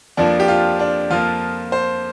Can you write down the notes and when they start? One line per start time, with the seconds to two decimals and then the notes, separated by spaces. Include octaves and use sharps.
0.17 F2 F3 A#3 D4
0.40 G4
0.48 F4
0.79 D4
1.11 F2 F3 A#3 F4
1.72 C5